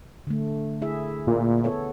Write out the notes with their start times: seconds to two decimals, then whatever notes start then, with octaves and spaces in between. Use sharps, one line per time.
0.27 D3 A3
0.82 E4 G#4 E5
1.27 A#2
1.64 B3 A4 C#5